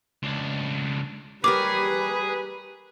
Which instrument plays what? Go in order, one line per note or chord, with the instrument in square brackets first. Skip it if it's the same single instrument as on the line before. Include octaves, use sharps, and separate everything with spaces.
[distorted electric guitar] C#2 D4
[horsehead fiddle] G3 B4 [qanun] G4 A#4 C#5 [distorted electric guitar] G#4 [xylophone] D6